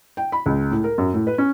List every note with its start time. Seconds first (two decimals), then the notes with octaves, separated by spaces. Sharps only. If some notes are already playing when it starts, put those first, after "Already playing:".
0.17 G5
0.32 B5
0.46 C#2
0.71 A2
0.84 A#4
0.98 F#2
1.14 A2
1.27 B4
1.38 C#4